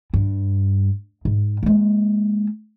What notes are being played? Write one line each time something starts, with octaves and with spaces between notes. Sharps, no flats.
G2
G#2
G#3 A#3